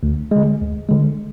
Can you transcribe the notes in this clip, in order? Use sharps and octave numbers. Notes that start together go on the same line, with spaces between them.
D2
D3 G#3
D2
D3 G#3